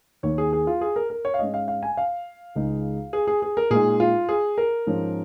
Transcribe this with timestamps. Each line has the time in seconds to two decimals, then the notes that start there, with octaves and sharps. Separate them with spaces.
0.23 D#2 D#3 A#3 C#5
0.38 G#4
0.53 G#4
0.67 F4
0.81 G#4
0.96 A#4
1.10 A#4
1.25 C#5
1.34 F5
1.39 G#2 G#3 C#4 D#5
1.54 F5
1.68 F5
1.83 G#5
1.97 F5
2.55 C#2 C#3 G#3 D#4
3.13 G#4
3.27 G#4
3.42 G#4
3.57 A#4
3.70 A#2 G#3 D#4 G#4
4.00 F4
4.29 G#4
4.58 A#4
4.87 G#2 F3 C#4